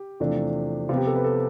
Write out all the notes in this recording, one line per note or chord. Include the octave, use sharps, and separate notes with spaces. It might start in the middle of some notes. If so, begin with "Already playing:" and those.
Already playing: G4
E2 C3 F3 A3 D4
C3 F3 B3 F4
G4
A4
B4
A4